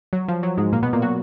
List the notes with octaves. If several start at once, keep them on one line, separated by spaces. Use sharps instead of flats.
F#3
F3
F#3
G#2 G#3
A#2 A#3
B2 B3
A#2 A#3
F#3 F#4